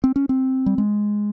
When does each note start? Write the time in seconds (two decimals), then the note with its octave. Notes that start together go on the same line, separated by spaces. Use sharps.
0.04 C4
0.16 C#4
0.29 C4
0.66 G3
0.78 G#3